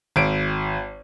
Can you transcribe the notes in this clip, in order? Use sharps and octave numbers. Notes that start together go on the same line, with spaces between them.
G#1 D7